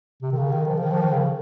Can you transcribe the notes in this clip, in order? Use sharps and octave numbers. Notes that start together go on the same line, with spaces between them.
C3
D#3
C#3
D#3
F3
C#3
D#3
F3
D#3
C#3